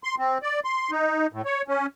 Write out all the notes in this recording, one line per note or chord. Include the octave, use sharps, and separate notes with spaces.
C6
C4
D5
C6
D#4
A2
C#5
C#4